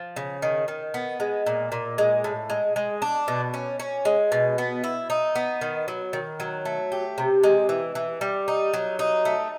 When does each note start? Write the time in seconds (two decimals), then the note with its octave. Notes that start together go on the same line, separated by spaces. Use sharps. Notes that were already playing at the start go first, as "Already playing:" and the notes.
Already playing: F3
0.16 C#3
0.42 D#3
0.68 D#3
0.94 B3
1.20 G#3
1.46 A#2
1.72 A#2
1.98 G#3
2.24 A2
2.50 G#3
2.76 G#3
3.02 D4
3.28 B2
3.54 C#4
3.80 C#4
4.05 G#3
4.32 B2
4.58 B3
4.84 E4
5.10 D#4
5.35 B3
5.61 D#3
5.88 F#3
6.13 D#3
6.40 F#3
6.65 A3
6.92 G4
7.18 C3
7.43 G#3
7.69 E3
7.95 E3
8.21 G3
8.48 D#4
8.74 F#3
8.99 D#4
9.25 A3